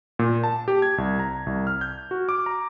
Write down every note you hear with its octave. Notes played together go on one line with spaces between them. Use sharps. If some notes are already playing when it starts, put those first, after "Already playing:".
A#2
A5
G4
G#6
C2
A#5
C2
F6
G6
F#4
D6
A#5